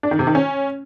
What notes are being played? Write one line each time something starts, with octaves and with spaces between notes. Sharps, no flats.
D4
D#3
C3
D#3
C#4